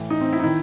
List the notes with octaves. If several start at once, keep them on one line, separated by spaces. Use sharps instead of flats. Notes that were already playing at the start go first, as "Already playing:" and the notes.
Already playing: A2 E3
D#4
C4
E4
D#4
D#3 E4